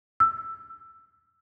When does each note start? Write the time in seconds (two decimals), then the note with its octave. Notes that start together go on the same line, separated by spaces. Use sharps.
0.20 E6